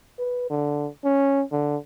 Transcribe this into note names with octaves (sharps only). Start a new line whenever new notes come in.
B4
D3
C#4
D3